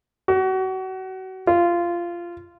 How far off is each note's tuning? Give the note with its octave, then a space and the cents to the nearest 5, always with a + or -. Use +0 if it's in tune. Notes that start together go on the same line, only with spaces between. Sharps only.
F#4 +30
F4 -15